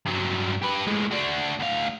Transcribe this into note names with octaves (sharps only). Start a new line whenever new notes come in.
G2 F#3
G4 B4
A2 G#3
D4 F#4
D2 F5